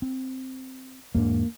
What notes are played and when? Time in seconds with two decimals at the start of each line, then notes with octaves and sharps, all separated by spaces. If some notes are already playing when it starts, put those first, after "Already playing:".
0.02 C4
1.15 E2 G#2 A#3 D4